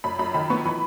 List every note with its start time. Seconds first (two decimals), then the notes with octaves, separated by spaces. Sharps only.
0.04 F#2 B5
0.19 F#2 B5
0.34 D#3 B5
0.50 B3 C#6
0.66 E3 B5